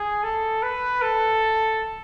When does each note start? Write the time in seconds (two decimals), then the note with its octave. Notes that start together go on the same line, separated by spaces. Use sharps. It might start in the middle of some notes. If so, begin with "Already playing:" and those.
Already playing: G#4
0.23 A4
0.63 B4
1.02 A4